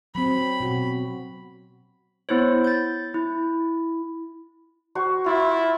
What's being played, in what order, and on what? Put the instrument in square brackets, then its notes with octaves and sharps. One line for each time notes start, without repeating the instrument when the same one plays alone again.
[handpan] F#3 C4 [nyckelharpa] B5
[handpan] B2 F#4
[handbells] B3 E4 C5 C#5
G6 A6
E4
[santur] F#4 C5 C#6
[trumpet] E4 [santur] F4